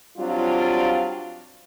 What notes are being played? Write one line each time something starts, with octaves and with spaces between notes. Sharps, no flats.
F#3 G3 C4 D4 F4